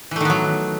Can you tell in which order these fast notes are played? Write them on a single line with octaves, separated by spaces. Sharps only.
E3 A3 D#3 B3 F#3